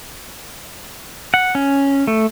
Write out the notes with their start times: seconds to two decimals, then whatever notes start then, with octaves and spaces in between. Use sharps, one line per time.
1.34 F#5
1.55 C#4
2.07 A3